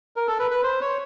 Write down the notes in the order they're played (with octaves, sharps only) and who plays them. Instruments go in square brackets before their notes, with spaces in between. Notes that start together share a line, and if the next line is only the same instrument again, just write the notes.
[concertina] A#4
A4
B4
B4
C5
C#5